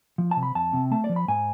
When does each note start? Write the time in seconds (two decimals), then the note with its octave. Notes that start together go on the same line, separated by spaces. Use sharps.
0.18 F3
0.31 A5
0.37 C3
0.43 B5
0.55 F2 A5
0.73 C3
0.91 A3 A5
1.04 D5
1.09 F3
1.16 B5
1.28 G#2 G#5